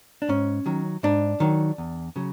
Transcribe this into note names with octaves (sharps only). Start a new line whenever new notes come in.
D4
G#2 C#4
D#3 F#3
G#2 D4
D#3 F#3
E2
C#3 F#3